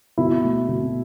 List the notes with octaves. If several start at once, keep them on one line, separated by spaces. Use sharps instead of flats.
B2 E4
A3
B2